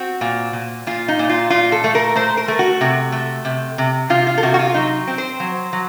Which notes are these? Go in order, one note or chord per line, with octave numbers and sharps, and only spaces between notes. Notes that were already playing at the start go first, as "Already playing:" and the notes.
Already playing: C4 F#4
A#2
A#2
A#2 F4
D#4
A#2
F4
A#2 F4
A4
A3
A#4
A3 C5
A#4
A3
F#4
C3
A3
C3
C3
C3 F4
F4
A4
C3 F#4
F#4
F4
F#3 D#4
C4
C5
F#3
F#3